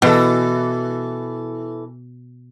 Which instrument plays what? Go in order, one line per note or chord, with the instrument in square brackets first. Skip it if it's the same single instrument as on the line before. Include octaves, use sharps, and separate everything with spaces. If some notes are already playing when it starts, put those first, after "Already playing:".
[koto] B2 [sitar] E3 A4